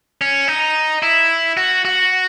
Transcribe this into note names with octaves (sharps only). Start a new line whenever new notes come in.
C#4
D#4
E4
F#4
F#4